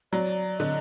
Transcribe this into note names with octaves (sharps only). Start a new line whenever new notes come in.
F#3 D5
D3 D#5